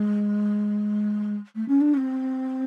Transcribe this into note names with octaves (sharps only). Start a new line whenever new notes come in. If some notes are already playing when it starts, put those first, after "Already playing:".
Already playing: G#3
A3
C#4
D4
C#4
C4